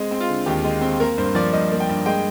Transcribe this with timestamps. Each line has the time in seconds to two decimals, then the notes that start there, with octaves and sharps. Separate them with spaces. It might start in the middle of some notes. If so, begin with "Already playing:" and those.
Already playing: G#3 C4
0.11 C4
0.20 F4
0.28 D3
0.46 D#2 G4
0.64 G#3
0.81 C4
1.00 A#3 A#4
1.18 G2 C5
1.35 F3 D5
1.53 G2 D#5
1.71 A#3
1.80 G5
1.89 G2
2.06 G#3 G5